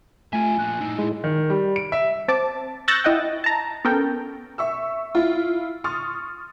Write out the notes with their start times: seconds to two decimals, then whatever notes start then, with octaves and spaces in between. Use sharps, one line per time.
0.33 A3 F4 E5 G#5
0.58 F3 A#3 F#6
0.81 A2 D#4 E6
0.99 G#3 E4
1.24 D#3
1.50 G3
1.76 D7
1.92 E5
2.28 C4 A5 D6
2.88 C#6 E6 F#6 G6 A6 A#6
3.04 E4 D#5 F#5 G5
3.44 A5 A#5
3.85 B3 C#4 A4 A#4 G5
4.58 E5 C#6 E6
5.15 E4 F4
5.84 C6 C#6 D#6 F6 A6